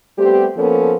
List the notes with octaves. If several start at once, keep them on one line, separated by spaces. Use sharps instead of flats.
G3 A3 B3 C4 G4
F3 A#3 B3 C#4 A4 A#4